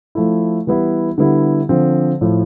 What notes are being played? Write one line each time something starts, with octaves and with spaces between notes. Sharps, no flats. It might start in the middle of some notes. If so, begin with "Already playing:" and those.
F3 A3 E4
E3 G3 B3 E4
D3 G3 B3 E4
D3 F3 C4
A2 F3 A3 E4